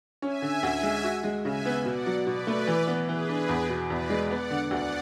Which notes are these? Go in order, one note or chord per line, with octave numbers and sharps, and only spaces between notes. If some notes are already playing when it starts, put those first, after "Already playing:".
C#4 E5 G#5
D3
D2
G#3
F#4
G#3
C#3 E5 G#5
B3
B2 D5 F#5
F#3
B2 B4 D5
A3
E3
B3
E3 G#4 B4
D4
E2
B2
E2 B4 D5
G#3
B3 D5 F#5
D3
D2 D5 F#5